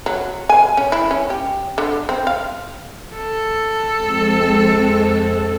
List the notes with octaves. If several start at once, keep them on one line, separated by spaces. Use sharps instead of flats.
F#3
G#5
C#4
E4
C#4
G4
D3
C4
F5
A4
F2 G#3 C4